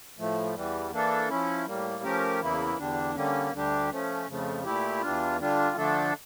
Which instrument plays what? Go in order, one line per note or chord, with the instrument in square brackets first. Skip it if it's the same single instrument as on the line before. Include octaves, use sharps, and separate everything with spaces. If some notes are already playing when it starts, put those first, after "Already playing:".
[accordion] A2 F3 A3
E2 E3 G3
E3 A#3 D4 A4
F3 C#4 E4
A2 G3 A#3
F3 A3 C#4 G4 A#4
E2 C#3 E3 A#3 E4
E2 D3 G3 D4
D3 G3 A#3 C#4
D2 D3 G3 D4 G4
F3 A3 C#4
F2 C#3 F3 A3
A#2 A3 E4 G4
E2 E3 G3 D4 F4
D3 G3 D4 F4
D3 F3 A3 D4 A4